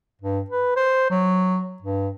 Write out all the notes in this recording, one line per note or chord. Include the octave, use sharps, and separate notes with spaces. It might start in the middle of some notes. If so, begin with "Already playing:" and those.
G2
B4
C5
F#3
G2